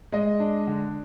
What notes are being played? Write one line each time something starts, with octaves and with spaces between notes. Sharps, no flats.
G#3 D#5
D4
D3